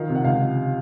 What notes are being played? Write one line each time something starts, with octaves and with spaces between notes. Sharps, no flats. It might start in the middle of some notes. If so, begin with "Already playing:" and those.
Already playing: D#3 F3 F5
C3
F#5
C#2 F5
F3